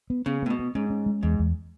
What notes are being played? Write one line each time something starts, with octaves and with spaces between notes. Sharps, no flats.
B3
C#3 B3
A2 B3
B2
B3
G#2 C#4
C#4
G#3
E2 G#2
E2